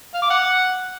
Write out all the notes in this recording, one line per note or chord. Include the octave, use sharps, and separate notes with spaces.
F5
D6
F#5